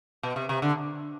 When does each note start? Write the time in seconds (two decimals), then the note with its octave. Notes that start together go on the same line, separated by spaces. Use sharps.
0.23 B2
0.36 C3
0.49 C3
0.62 D3